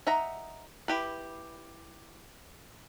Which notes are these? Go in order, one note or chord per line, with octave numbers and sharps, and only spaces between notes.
D#4 E5 F#5 A#5
E4 G4 B4